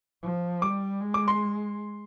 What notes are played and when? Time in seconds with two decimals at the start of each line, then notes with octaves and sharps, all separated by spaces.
0.23 F3
0.62 G3 D6
1.00 G#3
1.14 D6
1.28 C6